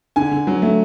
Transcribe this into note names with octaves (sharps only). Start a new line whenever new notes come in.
D3 G#5
D3
F#3
A3